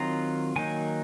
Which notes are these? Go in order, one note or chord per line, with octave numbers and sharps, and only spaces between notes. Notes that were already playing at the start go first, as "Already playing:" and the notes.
Already playing: D#3 F#3 C4 F4 A#5
D#3 F#3 A#3 D#4 G#5